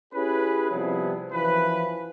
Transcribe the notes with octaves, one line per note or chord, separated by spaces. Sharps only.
C#4 E4 G4 G#4 B4
C3 F3 G3 B3 E4 G#4
F#2 E3 F3 B4